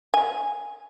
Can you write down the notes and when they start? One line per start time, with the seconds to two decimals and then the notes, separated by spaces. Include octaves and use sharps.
0.14 G#5